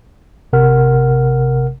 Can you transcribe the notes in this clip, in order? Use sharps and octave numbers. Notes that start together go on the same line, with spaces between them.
G#1 C3 A#4 F#5 F6